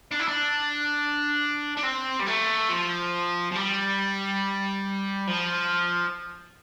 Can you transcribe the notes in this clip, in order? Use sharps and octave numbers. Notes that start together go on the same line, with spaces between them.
D4
E4
D4
D4
C4
G3
A3
F3
F3
G3
F3